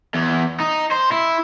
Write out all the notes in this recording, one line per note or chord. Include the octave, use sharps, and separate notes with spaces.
E2
D#4
C5
E4